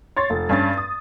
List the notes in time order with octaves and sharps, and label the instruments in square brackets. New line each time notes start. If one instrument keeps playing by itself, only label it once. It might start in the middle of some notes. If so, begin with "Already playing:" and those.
[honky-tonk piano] C#5 C6 A6
F1
G2 C#4 A6
D#6